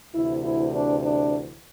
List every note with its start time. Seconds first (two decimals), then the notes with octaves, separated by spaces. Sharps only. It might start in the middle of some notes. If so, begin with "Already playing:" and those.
0.14 D2 C3 E3 E4
0.43 E4
0.74 D4
1.03 D4